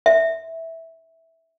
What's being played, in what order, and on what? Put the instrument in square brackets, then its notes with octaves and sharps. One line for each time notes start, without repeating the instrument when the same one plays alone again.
[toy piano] E5